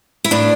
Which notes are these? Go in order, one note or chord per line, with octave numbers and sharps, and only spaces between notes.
E4
A2 D4